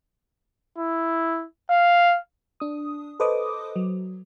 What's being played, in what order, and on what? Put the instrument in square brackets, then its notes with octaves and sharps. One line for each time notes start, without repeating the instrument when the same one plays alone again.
[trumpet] E4
F5
[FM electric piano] D4 D#6
A4 B4 C5 D#5 D6 D#6
F#3